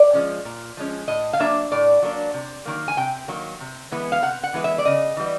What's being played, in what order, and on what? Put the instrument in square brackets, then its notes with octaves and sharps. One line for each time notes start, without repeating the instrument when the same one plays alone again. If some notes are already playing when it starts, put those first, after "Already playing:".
Already playing: [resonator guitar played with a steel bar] D5
F3 G#3 C#4
A#2
F3 G#3 C#4
A2 D#5
F5
F#3 A#3 D4 E5
A2 D5
F#3 A#3 D4
C3
D#3 F#3 A#3
G#5
C3 G5
D#3 F#3 A#3
C3
E3 G#3 B3 E4
F5
C3 F#5
F#5
E3 G#3 B3 E4
E5
D5
C#3 D#5
E3 G3 B3